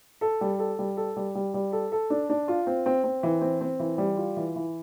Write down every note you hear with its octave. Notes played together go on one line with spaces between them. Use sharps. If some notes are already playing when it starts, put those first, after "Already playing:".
A4
G3
A4
G3
A4
G3
G3
G3
A4
A4
D4
D4
F4
C4
C4
C4
E3
C4
C4
E3
G3
F4
E3
E3